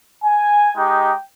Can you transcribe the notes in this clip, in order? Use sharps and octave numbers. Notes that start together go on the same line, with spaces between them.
G#5
G#3 D#4 G4 G5